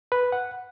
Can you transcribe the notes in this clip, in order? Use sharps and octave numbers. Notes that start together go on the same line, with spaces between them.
B4
F#5